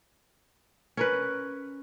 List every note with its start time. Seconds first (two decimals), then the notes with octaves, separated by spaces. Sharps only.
0.97 C#4 A#4 B4